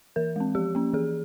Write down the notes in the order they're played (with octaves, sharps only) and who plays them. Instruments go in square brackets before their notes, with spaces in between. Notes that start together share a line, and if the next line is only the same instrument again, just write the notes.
[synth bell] E3 A#4
G#3 C4
F3 G4
A#3 C#4
E3 G#4